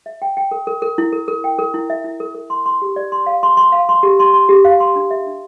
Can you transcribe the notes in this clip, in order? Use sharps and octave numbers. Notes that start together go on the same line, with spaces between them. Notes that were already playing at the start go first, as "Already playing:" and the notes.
E5
G5
G5
A#4
A#4
A#4
E4
A#4
A#4
G5
A#4
E4
E5
E4
A#4
A#4
C6
C6
G4
D5
C6
F5
C6
C6
F5
C6
G4
C6
C6
G4
F5
C6
D4
E5
D4